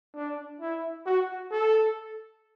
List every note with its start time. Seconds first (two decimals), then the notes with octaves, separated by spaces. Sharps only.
0.15 D4
0.60 E4
1.06 F#4
1.51 A4